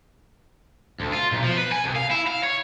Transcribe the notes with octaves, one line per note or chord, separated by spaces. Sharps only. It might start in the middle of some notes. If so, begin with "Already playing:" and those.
D2
F4
B1
F3
B4
G#5
C2
F5
E4
F5
C#5